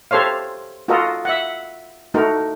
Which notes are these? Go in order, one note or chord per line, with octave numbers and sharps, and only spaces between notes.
G4 A4 C5 C#5 F5
F4 F#4 A4 A#4 D#5
E5 F#5
A3 D#4 F#4 A#4